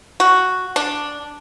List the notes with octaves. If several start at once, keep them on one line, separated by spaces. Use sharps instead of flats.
F#4
D4